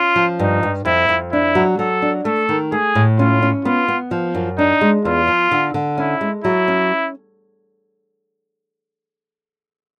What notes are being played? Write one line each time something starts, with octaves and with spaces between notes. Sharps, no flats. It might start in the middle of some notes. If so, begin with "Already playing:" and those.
Already playing: C#4 F4
F3
G2 D#4
G2
F2 E4
F2
D4 E4
F#3
F#3 A4
D4
A3 A4
D#3
A3 G#4
A2
C#4 F4
C#4
B3 F4
B3
F3
F#2
D4 D#4
G#3
E2 F4
F3
D3
D3
C#4 E4
G#3
F#3 E4
C#4